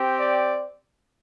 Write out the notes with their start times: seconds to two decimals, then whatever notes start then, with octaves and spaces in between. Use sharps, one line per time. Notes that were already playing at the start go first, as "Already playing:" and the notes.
Already playing: C4 G4
0.19 D5